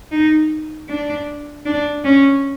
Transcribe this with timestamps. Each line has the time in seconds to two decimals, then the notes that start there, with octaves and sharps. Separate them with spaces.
0.12 D#4
0.89 D4
1.66 D4
2.05 C#4